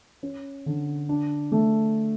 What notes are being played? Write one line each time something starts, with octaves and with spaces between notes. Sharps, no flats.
C#4
D3
D4
A3